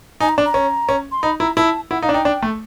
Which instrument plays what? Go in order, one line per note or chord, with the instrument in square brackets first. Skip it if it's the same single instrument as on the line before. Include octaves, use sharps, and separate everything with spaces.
[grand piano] D#4 [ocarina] G#5
[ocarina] A#5
[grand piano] D4
[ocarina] A#5
[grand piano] C#4
C#4
[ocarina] C6
[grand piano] D#4 [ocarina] B5
[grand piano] E4 [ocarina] A#5
[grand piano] E4 [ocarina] A5
[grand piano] E4 [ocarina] F#5
[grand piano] D#4 [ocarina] F5
[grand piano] D4
[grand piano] D#4 [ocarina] G5
[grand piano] D4
A3